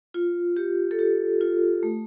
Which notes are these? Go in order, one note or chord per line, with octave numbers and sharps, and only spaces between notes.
F4
G4
A4
G4
F4
A3